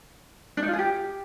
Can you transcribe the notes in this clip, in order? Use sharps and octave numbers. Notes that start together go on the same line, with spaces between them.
D4
D#4
F4
G#4
G4